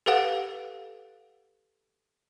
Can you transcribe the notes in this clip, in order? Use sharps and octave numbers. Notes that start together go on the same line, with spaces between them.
G4 A4 B4 F5 F#5